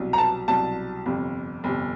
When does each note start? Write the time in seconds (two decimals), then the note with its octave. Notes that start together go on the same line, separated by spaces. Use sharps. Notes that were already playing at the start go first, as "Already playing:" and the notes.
Already playing: C2 B2 F#3
0.13 A#5
0.18 A5
0.48 C2 B2 F#3 A5
1.06 G1 F2 C3
1.64 G1 F2 C3